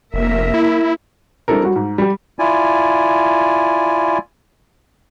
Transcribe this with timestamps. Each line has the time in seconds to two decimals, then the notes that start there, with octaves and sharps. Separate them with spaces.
0.14 F1 A#3 A#4 E5
0.54 E4
1.48 G3 C4 D4 E4 A4 A#4
1.62 F#3 G3 F#4
1.76 G#2
1.98 G3 G4
2.39 E4 F4 D5 G#5